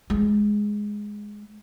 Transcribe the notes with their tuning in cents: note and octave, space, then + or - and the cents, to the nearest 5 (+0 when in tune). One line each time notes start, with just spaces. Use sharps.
G#3 +0